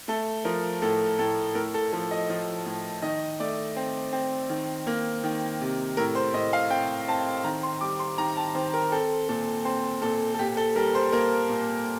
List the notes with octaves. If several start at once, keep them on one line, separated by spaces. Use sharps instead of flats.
A3 A4
F3 A#4
A2 A4
A2 A4
A2 A#4
A4
F3 A4
D#5
F3
A2
D#3 D#5
A3 D5
C4
C4
D#3
A#3
D#3
C3
A2 A#4
C5
A2 D#5
F5
C4 G5
C4 A5
D#3 A#5
C6
G3 D6
C6
D#3 A#5
A5
D#3 C5
A#4
C4 A4
A#2 A4
C4 C5
A#2 A4
A4
A#2 G4
A4
G3 A#4
C5
A#3 A#4
A#2